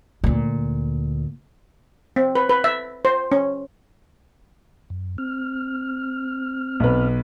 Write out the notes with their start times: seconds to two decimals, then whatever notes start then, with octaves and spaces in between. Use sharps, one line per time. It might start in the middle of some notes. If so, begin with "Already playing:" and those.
0.24 D2 A#2
2.16 C4
2.35 B4
2.49 B4
2.64 E5
3.05 C5
3.32 C#4
4.90 F#2
5.18 C4 F6
6.80 B1 B4